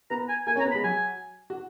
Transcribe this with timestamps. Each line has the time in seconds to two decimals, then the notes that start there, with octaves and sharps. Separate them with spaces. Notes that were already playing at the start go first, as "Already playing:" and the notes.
0.10 B3 B4 A#5
0.29 G#5
0.47 A#3 A#4 G#5
0.56 C#4 C#5
0.60 A#5
0.65 B3 B4
0.71 B5
0.75 G#3 G#4
0.83 F#3 F#4 G#5
1.50 F#4